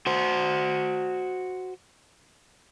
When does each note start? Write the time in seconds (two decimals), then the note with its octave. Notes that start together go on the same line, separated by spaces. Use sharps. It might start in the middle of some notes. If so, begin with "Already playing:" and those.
0.07 F#4 C5